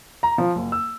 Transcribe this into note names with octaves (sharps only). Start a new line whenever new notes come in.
A#5
F3
F#1
E6